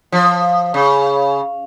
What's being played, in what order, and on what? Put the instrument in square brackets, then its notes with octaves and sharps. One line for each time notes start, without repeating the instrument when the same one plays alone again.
[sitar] F3
C#3